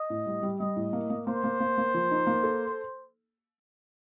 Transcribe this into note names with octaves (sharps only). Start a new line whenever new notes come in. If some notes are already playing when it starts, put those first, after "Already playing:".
Already playing: D#5
A2
G3
G3
G3 D#5
A2
A#3
A#3
A#3 C5
A#3
A#3
A#3
F3
D#4
A#3
A4